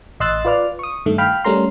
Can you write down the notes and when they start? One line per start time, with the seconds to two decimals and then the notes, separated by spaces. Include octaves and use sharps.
0.20 A1 D#5 C6 E6 F#6 A6
0.45 F4 B4 D5 F5 F6
0.79 C#6 D#6
1.06 G2 D#3 A3
1.18 F5 G5 B5 F6
1.44 G3 A3 C#4 A#4 A#5 C6